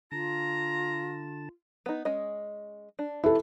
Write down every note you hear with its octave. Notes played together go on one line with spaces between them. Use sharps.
D3 F4 A5 A#5
B3 D#4
G#3 C#4 D#5
D4
E3 E4 A4